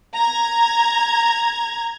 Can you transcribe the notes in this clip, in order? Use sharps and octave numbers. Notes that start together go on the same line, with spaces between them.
A#5 G#6